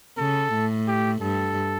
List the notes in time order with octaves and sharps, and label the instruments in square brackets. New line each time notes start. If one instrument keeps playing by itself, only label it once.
[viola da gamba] C#3 [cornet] A4
[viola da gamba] A2
[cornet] G4
[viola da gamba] G2 [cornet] A4